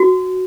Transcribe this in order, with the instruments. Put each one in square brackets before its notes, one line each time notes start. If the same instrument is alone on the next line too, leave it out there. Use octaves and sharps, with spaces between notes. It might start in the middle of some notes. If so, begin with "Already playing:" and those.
Already playing: [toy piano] F#4